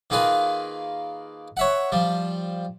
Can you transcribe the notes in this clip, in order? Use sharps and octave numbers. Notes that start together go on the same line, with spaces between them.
D#3 A#3 F4 G#4 B4
C#5 E5 F#5
F3 G3